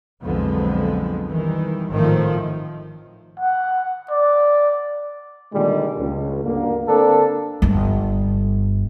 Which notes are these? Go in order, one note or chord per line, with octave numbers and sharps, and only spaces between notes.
B1 F2 D3 F3 G#3 B3
D#3 E3 G3
G#1 A2 D#3 F3 A3 C4
F#5
D5
A#2 D3 D#3 G3 G#3
C#2
D2 G2 D3 A#3
D3 A#3 C4 D4 A4 A#4
G1 G2